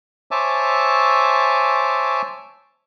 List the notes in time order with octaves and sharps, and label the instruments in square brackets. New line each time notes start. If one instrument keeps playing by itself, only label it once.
[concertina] C5 C#5 E5 G#5 A5 D6